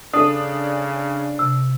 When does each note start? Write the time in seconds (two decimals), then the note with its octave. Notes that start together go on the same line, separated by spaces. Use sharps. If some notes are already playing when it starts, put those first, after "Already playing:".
0.13 C#3 D4 A4 D#6
1.39 C3